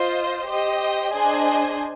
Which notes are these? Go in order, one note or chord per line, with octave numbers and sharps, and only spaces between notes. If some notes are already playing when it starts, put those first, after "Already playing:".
Already playing: F4 C5 D#5
G4 C5 D#5 G5
D4 G#4 C5 D#5 G#5